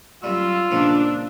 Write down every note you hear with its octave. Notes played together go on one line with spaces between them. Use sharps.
F#2 G3 F4 E6
C#2 A#2 F3 D4